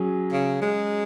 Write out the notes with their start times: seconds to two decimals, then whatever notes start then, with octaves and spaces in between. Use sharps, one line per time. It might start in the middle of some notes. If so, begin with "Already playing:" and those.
Already playing: F#3 C#4 G#4
0.32 C#3
0.62 G#3